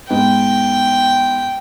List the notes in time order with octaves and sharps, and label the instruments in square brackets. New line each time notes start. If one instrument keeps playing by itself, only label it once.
[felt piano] G#2 B3 [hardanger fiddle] G5